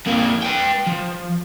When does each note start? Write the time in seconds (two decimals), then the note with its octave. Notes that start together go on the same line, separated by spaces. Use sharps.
0.06 F2 A#3
0.43 B4 G5
0.87 F3